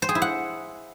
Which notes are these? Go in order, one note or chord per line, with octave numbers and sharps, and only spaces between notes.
C5
G#4
E4
F#5